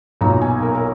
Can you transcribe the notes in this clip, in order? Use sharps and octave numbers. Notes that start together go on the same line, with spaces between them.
B1 A#2 F#3 B3 D#4 A#5
G#5
A#4
A#4